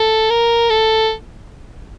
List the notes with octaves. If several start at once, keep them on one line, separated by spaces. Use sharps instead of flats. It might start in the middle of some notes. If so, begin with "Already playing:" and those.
Already playing: A4
A#4
A4